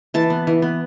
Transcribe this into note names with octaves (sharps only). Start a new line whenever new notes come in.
E3 A5
B3
E3
B3